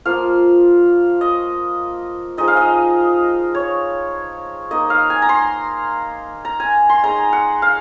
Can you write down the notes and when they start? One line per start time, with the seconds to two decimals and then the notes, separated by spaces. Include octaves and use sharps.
0.05 F3 A#3 F4 F5
1.21 D#5
2.38 F3 G#3 D#4 D#5
2.48 F5
2.57 D#5
3.55 C#5
4.71 A#3 D#4 D#5
4.90 F5
5.10 G#5
5.22 A#5
5.29 C6
6.45 A#5
6.60 G#5
6.89 C6
7.03 G#3 D#4 A#5
7.33 F#5
7.62 F5